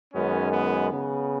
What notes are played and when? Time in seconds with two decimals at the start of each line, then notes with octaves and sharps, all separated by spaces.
0.13 F#2 D#3 G#3 B3 C#4
0.52 B3
0.91 C#3 B3